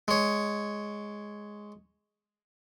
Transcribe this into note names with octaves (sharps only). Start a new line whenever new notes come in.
G#3 C#5